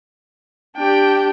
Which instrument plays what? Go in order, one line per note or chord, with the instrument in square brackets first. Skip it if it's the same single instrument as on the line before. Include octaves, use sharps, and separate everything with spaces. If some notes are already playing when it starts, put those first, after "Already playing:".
[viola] D4 G4 [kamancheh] G5